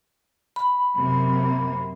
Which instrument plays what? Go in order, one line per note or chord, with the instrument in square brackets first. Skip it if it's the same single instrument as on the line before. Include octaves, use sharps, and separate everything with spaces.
[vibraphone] B5
[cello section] F#2 C3 A#3